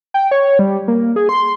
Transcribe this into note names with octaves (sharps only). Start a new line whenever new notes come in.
G5
C#5
G3
A#3
G#4
C6